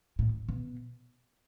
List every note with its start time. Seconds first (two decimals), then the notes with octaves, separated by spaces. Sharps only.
0.19 A2
0.49 B2